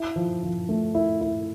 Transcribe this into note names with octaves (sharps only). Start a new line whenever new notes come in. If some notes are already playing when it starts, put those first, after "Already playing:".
Already playing: E4
F3
F3
A3
E4
E4